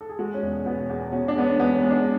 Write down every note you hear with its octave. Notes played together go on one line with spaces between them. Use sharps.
A4
G#4
G#3 F#4
C#4
E1
B2 B3
E2
B2 C#4
D4
G#3 B3
C#4
E2 B3
C#4
G#3
D4